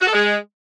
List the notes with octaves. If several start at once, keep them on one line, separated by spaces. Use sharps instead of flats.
F#4
A4
G#3